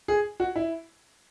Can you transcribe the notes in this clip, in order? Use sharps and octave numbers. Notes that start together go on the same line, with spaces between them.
G#4
F#4
E4